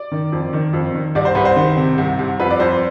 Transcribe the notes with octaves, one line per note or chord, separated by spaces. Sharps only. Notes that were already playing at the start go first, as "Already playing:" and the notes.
Already playing: D5
D#3
F2
D#3
F2
D#3
C2 D5
C5
C2 B4
C5
D#3
C3
C2
C2
F2 B4
D5
F2 C5